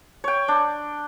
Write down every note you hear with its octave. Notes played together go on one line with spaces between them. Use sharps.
C#5 G5
D4